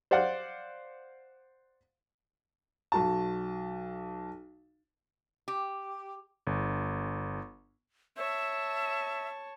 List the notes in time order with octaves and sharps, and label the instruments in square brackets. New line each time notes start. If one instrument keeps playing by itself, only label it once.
[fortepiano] C5 D5 F5 F#5
[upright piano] B1 F#4 A5
[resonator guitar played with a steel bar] G4
[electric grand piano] G1
[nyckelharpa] C#5 A5 [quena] E5